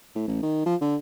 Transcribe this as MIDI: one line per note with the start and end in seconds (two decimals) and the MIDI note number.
0.15 0.23 45
0.28 0.39 33
0.43 0.62 51
0.66 0.76 53
0.81 0.96 50